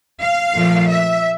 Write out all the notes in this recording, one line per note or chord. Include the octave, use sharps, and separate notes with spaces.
F5
A#2 F3 A3
E5